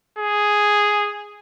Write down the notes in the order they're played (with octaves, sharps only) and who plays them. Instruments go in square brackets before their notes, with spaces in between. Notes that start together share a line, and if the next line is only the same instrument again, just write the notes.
[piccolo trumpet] G#4